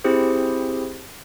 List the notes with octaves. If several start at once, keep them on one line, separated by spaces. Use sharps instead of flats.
C4 E4 G4 G#4 C5